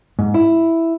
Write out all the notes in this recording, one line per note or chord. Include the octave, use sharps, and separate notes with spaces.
G#2
E4